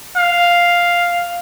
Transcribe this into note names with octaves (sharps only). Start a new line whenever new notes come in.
F5